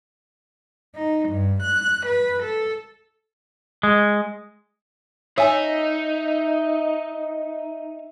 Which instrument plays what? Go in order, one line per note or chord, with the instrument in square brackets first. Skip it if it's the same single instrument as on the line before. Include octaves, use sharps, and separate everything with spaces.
[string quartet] D#4
G2
F#6
B4
A4
[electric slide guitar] G#3
[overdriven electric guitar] D#4 [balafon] C#5 G#5 [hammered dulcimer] E5